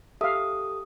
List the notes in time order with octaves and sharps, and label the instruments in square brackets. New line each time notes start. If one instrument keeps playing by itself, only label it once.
[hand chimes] G4 A4 D#6 [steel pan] E5 F5